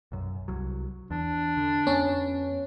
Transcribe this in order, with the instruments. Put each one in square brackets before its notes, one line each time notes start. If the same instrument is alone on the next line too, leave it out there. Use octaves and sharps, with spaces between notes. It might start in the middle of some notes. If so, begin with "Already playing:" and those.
[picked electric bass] B1 F#2
C2 F#3
[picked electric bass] E2 [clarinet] D4
[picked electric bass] D3
[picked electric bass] F2 B3 [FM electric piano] C#4